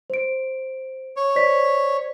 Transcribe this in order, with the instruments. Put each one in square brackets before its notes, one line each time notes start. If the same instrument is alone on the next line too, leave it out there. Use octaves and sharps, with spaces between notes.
[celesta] C5 D7
[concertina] C#5
[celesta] C5 D5 B6